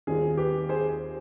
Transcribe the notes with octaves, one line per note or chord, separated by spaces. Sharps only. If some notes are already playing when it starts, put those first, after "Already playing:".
D#2 D#3 G3 C4 F4 G#4
G4 B4
G#4 C5